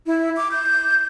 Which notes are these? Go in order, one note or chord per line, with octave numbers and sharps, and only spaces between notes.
E4
D6
G6